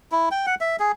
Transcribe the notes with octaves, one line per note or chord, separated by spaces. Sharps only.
E4
G5
F#5
E5
G#4